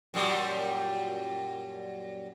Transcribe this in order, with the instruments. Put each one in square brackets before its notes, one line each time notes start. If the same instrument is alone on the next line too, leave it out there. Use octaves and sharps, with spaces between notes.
[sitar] F#2 A#2 G3